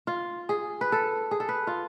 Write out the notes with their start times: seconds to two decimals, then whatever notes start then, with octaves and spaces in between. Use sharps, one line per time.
0.07 F4
0.49 G#4
0.81 B4
0.92 A4
1.31 G#4
1.40 A4
1.49 B4
1.67 F4